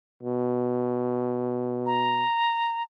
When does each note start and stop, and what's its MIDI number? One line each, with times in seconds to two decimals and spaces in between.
0.23 2.23 47
1.86 2.83 82